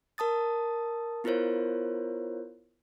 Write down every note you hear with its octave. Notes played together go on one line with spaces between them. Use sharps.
A#4 A5 D#6 A6
B3 E4 F4 A#4 C5 C#5